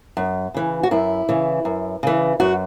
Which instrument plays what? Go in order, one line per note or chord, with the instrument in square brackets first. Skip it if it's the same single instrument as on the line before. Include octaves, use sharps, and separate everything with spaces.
[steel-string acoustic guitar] F#2
C#3 E3
F#4
F#2 E4
C#3 E3
F#2
C#3 E3
F#2 F#4